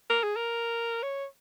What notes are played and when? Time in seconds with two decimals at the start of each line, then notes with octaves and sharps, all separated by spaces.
0.10 A#4
0.23 G#4
0.36 A#4
1.03 C#5